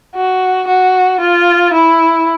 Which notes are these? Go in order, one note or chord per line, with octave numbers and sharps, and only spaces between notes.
F#4
F#4
F4
E4